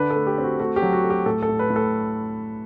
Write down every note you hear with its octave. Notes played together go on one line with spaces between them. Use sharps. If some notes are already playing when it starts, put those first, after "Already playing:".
Already playing: D3 D4 B4
A4
A3
G4
C4
F#4
A3 F#4
G4
F#3
F#4
A3
G4
A2 A4
A4
A2
B4
A2
A4